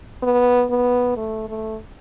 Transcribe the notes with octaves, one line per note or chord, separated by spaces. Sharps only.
B3
B3
A3
A3